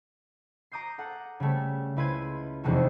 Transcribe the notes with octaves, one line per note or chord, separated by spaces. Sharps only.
A#5 D6 D#6 G6 C7
A4 F#5
C#3 G3 A3
C#2 E4 B4 C6 G#6 D#7
F1 E2 C3 G#3 A3 F#4